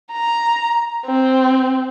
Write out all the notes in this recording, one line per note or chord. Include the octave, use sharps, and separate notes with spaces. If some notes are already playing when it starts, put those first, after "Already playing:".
A#5
C4